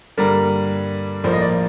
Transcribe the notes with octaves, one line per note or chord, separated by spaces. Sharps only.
G2 D3 G3 A#3 A#4
A#1 A2 F3 A#3 C5
D#5
D5